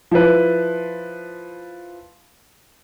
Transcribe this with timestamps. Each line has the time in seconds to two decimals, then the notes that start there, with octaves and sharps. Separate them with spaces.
0.11 F3 E4 B4